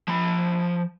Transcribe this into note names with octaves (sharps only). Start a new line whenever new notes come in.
F3 B5